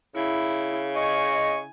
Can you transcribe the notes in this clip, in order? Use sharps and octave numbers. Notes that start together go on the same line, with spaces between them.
C#3 E4
D#5 G#5 C#6